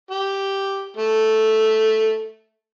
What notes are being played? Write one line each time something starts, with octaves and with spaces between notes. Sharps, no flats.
G4
A3